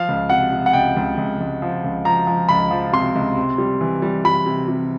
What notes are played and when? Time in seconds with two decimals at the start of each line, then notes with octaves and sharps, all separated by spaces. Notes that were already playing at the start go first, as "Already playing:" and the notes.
Already playing: F3 F5
0.09 C#2
0.30 C3 F#5
0.52 C3
0.66 F#5
0.73 C#2 G5
0.96 C#2
1.18 C#2
1.40 C#2
1.62 F3
1.84 C#2
2.05 F3 A#5
2.27 F3
2.49 C#2 B5
2.71 F3
2.92 C3 C6
3.15 C#2
3.37 C3
3.58 G3
3.81 E3
4.02 G3
4.25 G3 B5
4.46 C3
4.68 C3